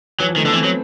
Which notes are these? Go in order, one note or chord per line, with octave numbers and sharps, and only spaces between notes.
E3 F#3
F3
D#3 A3
D3 B3
E3 C4
F#3 B3